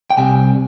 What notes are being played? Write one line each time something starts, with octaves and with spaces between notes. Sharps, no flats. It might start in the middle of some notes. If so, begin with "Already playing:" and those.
G5
C2 C3 G3 G#5